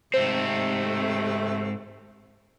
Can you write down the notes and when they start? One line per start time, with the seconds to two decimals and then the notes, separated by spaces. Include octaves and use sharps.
0.14 G#2 C3 A3 C4 C5